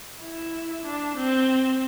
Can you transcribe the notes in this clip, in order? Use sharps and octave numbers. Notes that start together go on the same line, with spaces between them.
E4
D4
C4